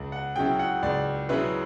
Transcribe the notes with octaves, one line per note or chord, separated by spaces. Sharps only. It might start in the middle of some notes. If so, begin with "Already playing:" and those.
Already playing: C#2
F#5
C#3 F#3 C#4 E4 G5
F#5
C#2 D5
C#3 F#3 C#4 E4 B4